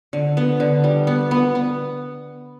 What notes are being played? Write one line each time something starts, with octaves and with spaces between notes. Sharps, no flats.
D3
B3
D3
G3
B3
B3
B3